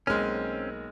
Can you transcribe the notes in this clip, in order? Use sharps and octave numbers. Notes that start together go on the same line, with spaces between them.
B1 G#3 A#3 C4 C#4 F6